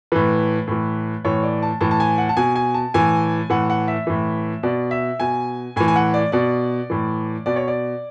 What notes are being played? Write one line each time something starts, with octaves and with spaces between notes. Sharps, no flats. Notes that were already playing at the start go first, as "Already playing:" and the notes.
A2 E3 B4
A2 E3
A2 E3 C#5
D5
A5
A2 E3 A5
A5
G#5
F#5
A5
B2 G#5
G#5
A5
A2 E3 G#5
A2 E3 F#5
F#5
E5
A2 E3
B2 D5
E5
B2 G#5
A2 E3 G#5
G#5
F#5
D5
B2 D5
A2 E3
B2 D5
C#5
D5